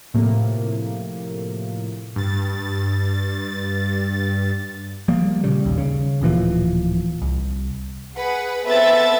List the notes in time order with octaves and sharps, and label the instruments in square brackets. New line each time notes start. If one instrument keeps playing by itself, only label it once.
[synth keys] A2 C3 F3 A#3
[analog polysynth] G2 A6
[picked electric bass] F3 G3 A#3
A#2 C#3 G3
A#1 D#2
C#3
D1 A#2 E3 F3
C2
[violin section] G#4 B4 F#5
B3 C4 A4 B4 E5 A6